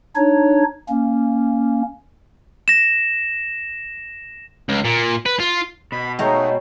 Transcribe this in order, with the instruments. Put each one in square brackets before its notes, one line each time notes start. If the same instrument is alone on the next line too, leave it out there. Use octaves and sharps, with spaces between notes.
[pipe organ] D4 D#4 C#5
A#3 C#4
[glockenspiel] A#6 E7
[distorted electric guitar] C#2
A#2
B4
F4
[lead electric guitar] B2 [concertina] B5
[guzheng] G#3 A#5 [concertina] A3 D#4 [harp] C#5 G5